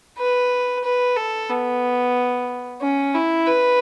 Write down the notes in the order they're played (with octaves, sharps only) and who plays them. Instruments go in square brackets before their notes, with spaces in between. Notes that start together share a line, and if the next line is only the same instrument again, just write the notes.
[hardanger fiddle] B4
B4
A4
B3
C#4
E4
B4